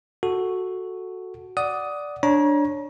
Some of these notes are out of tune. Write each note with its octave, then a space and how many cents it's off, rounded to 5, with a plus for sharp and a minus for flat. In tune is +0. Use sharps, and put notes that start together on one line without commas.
F#4 +0 A4 +0
D5 +0 F#5 +0 D#6 +10
D4 +0 C#5 -10 A#5 +35